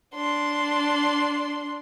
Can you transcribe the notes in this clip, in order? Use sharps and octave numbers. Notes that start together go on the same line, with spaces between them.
D4 C6